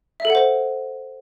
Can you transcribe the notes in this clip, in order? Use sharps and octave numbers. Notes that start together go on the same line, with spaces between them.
E5
A4
F#5
C5